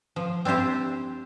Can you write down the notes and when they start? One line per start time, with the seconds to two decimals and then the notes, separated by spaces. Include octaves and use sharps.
0.16 F3
0.45 C4 D4 E4 G4 C5